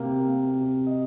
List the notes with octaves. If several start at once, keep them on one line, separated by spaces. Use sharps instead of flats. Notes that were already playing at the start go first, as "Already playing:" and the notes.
Already playing: C3 A#3
A#3
C3
D#5